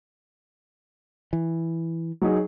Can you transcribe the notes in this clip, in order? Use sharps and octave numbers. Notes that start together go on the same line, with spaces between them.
E3
F#3 D#4 G#4